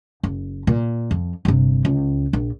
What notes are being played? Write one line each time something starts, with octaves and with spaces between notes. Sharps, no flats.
F#1
A#2
F2
G1 C3
C#2
A#1